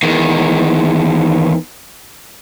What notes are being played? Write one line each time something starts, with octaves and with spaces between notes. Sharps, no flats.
E2 D#3